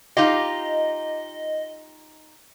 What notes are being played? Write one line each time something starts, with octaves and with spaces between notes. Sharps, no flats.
D#4 F4 G4 D#5